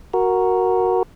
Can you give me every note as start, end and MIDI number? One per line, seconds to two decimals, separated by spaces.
0.14 1.03 66
0.14 1.03 70